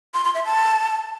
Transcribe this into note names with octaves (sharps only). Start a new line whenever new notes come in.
C6
C6
E5
A5